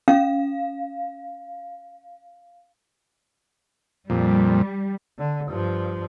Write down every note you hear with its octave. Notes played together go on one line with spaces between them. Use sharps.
C#4 F5
F2 A#2 G3
D3
G2 F3